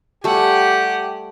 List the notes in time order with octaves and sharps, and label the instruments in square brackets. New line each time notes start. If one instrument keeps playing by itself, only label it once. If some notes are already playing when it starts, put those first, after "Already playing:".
[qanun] G3 A3 [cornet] G4 [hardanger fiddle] F#5 G#5